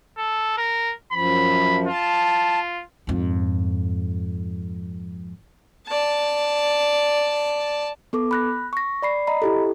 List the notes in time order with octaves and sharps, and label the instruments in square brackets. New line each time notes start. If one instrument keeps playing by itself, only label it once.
[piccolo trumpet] A4
A#4
[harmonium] F#2 F3 [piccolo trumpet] B5
[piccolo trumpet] F4 [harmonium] A5
[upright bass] F2 G#2
[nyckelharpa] D5 A5
[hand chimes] B3 A4 D6
B5 F#6 A#6
C#6 A#6
D5 B5 C7
D#5 A#5 B5
E4 G4 A4